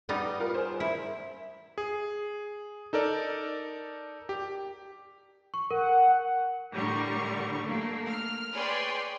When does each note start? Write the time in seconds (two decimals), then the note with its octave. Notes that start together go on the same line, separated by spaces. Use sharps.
0.09 G3 B3 D#4
0.40 F4 A#4 B4
0.54 G#4 A#4 C5
0.80 E4
1.78 G#4
2.93 D#4 A4 A#4 D5
4.29 G4
5.54 C#6
5.71 A#4 F#5
6.71 A2 D3 G3 A#4 C#6
7.62 A3 A#3
8.10 F6
8.53 G#4 B4 C#5 D5 G5 C6